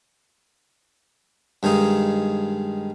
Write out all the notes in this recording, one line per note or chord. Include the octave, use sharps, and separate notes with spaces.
G2 D#3 G#3 D#4